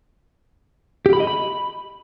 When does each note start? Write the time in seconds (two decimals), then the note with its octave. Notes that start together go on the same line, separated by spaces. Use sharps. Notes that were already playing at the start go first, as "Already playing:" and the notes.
1.06 G4
1.13 B5
1.20 D#5
1.27 B5